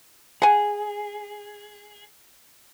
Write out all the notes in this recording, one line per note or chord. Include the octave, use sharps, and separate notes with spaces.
G#4 F#5 G#5